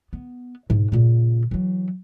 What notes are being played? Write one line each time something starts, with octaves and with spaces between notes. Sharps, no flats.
B3
G#2 B2
A#2 C#3
E3 F#3